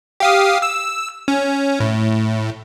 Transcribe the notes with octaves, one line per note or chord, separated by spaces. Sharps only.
G4 F5 D#6
E6
C#4
A2